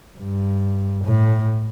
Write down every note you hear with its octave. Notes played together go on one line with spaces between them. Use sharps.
G2
A2